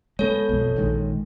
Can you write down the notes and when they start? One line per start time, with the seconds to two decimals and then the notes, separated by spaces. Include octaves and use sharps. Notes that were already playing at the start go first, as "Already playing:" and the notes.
0.19 G#3 B3 A4 C#5
0.49 B1 F2
0.76 A#1 D#3 G#3